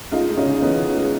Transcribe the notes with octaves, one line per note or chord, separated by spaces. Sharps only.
G#3 D#4 F4
G#3
C#4 D#4
C#3
E3 B3
C#3
G#3